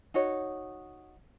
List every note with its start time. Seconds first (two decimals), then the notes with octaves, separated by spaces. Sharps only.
0.14 D#4 F#4 C#5